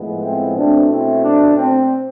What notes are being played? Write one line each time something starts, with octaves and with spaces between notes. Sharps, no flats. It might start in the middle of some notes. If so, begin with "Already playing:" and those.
Already playing: A2 F3 G#3 B3
C4 E4
B2 A3 C4 D4
C4 E4
D4
C4